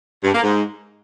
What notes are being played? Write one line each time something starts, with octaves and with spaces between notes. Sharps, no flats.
G2
A#3
G#2